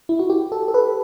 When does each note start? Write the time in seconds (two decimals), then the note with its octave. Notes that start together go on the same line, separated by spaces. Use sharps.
0.09 E4
0.19 F#4
0.30 G4
0.52 A4
0.68 A4
0.74 B4